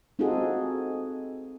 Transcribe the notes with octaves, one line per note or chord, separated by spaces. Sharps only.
C4 D#4 F4 F#4 G#4 A4